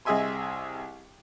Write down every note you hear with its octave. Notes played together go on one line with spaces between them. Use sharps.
C2 G#4 D#5 E5 G#5 C6